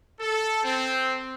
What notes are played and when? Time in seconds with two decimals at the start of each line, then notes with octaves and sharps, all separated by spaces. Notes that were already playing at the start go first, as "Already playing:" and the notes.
0.19 A4
0.64 C4